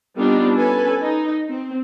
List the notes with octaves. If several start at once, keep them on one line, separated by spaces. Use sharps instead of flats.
G3 B3 C4 D4 D#4 F4
C#4 A4 B4 G#5
D#4
C4